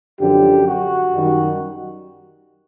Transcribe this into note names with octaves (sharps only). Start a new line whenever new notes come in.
F#2 D3 F3 G4
F#4
F#2 D#3 G3